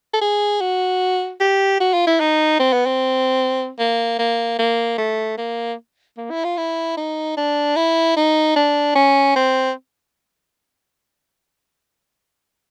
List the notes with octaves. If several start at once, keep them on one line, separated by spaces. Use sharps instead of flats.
A4
G#4
F#4
G4
F#4
F4
E4
D#4
C4
B3
C4
A#3
A#3
A#3
A3
A#3
A#3
E4
F4
E4
D#4
D4
E4
D#4
D4
C#4
C4